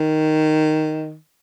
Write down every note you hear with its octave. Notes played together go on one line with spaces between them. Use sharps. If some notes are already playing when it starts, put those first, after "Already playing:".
Already playing: D#3